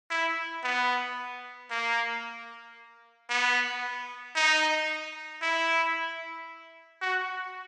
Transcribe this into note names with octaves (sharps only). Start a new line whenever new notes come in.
E4
B3
A#3
B3
D#4
E4
F#4